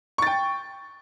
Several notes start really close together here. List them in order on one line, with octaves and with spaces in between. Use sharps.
C#6 A6 G5